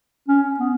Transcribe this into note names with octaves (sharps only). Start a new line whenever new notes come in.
C#4
B3